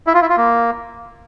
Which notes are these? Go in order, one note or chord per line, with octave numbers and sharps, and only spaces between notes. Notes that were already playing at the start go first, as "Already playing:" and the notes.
E4
F4
E4
F4
A#3